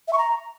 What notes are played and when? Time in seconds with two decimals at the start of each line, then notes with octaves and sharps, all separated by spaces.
0.08 E5
0.13 C#6
0.18 A#5